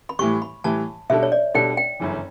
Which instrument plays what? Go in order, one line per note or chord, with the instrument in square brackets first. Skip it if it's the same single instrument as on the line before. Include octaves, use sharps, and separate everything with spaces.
[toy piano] B5
[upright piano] A2 E3 G3 [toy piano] C#6
[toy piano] B5
[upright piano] A2 E3 G3 [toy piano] A5
[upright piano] B2 G3 D4 A4 [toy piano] E5
[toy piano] C#5
D5
[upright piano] B2 G3 D4 A4 [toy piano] G5
[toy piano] G5
[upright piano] G1 F#2 C#3 E3